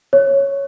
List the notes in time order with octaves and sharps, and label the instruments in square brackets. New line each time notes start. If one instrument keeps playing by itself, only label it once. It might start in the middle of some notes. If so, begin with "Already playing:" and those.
[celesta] C#5